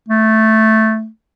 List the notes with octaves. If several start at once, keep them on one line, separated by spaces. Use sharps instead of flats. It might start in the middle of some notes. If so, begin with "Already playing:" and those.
A3